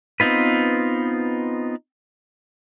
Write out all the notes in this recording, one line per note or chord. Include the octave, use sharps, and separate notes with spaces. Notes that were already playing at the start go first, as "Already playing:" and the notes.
B3 C4 D#4 F4 B4